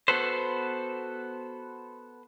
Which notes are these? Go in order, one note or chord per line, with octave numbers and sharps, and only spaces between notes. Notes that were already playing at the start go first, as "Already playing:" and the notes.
B3 F#4 A4 B4 C5